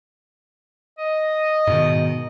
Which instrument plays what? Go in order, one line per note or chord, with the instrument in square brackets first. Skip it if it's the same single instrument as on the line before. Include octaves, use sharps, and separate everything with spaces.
[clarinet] D#5
[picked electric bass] G#2 B2 D#3